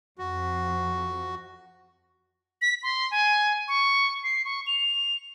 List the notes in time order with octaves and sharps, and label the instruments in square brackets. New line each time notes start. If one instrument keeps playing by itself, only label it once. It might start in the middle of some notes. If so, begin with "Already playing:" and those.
[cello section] F2 [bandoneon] F#4
[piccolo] B6
C6
G#5
C#6
C7
C#6
F7